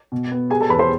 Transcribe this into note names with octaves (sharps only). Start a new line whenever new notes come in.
B2
B3
G3 G#4 G#5
A4 A5
E2 B4 B5
C5 C6